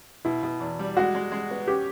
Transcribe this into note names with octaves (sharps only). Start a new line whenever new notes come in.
B2 E4
B2
E2
G3
G#3 F#4
G#3
G#3
B3
C#4 G4